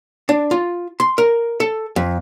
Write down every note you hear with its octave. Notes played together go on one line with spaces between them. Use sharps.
D4
F4
C6
A#4
A4
F2